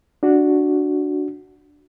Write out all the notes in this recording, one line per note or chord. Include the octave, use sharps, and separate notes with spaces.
D4 F#4